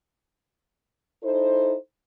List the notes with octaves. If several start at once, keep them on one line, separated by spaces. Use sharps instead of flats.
D#4 E4 A4 C5